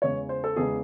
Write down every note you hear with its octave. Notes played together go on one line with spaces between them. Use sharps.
E2 C#3 G#3 C#5
C5
A4
E2 C#3 G#3 G#4